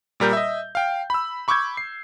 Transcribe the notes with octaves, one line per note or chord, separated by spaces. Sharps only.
A#2 G3 A#4 G6
D#5 E5
F5 G5
B5 E6
B5 C#6 D6 E6 G6 G#6
C7